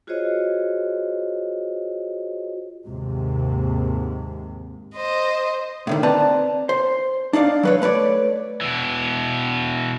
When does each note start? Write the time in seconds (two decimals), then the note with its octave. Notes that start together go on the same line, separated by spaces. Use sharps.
0.07 F4 F#4 G#4 C5 C#5 D#5
2.88 D#2 G#2 C3
4.95 C5 D#5
5.87 A2 D3 D#3
6.03 C4 B4 D5 A5 A#5
6.69 C5
7.33 D4 D#4 D5 F5
7.63 F#3 B4 C#5
7.82 A3 B4 C#5 D5
8.61 B2 E3